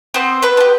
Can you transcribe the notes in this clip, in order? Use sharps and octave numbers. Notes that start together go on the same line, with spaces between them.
B3 C4 C5
B3 B4
D4
G4